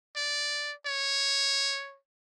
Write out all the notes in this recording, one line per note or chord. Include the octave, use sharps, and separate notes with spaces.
D5
C#5